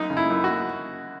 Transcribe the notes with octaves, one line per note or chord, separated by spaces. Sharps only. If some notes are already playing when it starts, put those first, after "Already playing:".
Already playing: F#2 D#4
C#3
E4
F#2
F#4
F#2